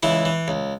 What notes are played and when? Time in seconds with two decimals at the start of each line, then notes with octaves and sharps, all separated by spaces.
0.03 C#2 E3 E4
0.25 E3
0.48 C#2